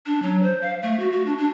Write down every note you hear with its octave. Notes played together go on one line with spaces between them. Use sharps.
D4
F#3
C5
F5
A3
F#4
F#4
D4
D4